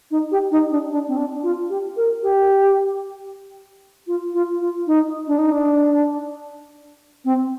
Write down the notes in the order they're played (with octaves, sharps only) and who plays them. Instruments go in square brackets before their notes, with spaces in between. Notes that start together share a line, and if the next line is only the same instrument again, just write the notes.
[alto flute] D#4
G4
D#4
D4
D4
C4
D4
F4
G4
A#4
G4
F4
F4
F4
D#4
D4
D#4
D4
C4